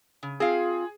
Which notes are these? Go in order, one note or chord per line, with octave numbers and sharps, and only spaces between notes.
C#3
C4 F4 G#4 F5